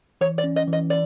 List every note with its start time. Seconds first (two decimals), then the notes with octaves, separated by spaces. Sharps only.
0.21 E3 C#5
0.38 D5
0.44 C#4
0.56 D#5
0.68 E3
0.73 D#5
0.90 D5